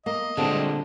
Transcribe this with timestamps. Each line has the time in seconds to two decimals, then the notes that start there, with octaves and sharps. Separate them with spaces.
0.06 A#3 D#5
0.37 A#2 D3 G3 G#3 C4